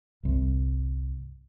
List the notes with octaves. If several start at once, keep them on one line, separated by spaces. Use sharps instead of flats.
G1 C2